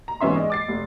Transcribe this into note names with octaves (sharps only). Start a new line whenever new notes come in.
A#5
G#2 E3 B3 C#4 E5 C6
G#3 D5
D6 A6 C7
F1